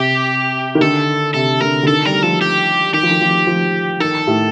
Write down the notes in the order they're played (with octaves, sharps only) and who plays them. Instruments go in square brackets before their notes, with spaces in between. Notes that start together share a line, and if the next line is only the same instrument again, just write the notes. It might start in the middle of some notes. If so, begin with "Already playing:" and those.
Already playing: [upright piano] C3 [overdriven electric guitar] G4
[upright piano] D#3
[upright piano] D3 [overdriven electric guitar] A4
[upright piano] C3 [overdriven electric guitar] A4
[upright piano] D3 [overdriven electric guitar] A#4
[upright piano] D3
[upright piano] D#3 [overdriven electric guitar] A4
[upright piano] G3 [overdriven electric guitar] A#4
[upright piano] F3 [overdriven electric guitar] A4
[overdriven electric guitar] G4
[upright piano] D#3 [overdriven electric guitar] G4
[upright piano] F3
D#3
F3
F3
[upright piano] D#3 [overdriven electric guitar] A4
[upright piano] A2